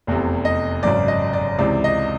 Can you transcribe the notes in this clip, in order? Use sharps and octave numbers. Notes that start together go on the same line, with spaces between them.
F1 E2 C3
D#5
G#1 F#2 C#3 D5
D#5
D5
C#2 C3 E3 D5
D#5